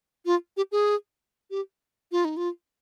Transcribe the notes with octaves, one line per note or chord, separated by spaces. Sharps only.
F4
G4
G#4
G4
F4
D#4
F4